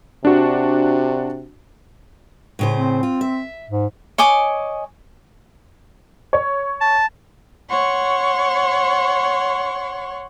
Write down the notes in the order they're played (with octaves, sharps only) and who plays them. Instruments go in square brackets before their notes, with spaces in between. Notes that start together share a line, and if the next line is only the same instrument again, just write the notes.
[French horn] C3 [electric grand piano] D4 F#4
[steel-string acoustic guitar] A2 C#3 C5
[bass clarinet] C4
[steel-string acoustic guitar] F4
E5
[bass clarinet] G#2
[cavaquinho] C#5 D#5 G#5 D6
[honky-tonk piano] C#5
[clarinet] A5
[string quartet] C#5 F#5 C6 C#6